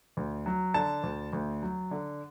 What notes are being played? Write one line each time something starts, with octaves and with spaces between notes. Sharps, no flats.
D2
F#3
D3 A5
D2
D2
F#3
D3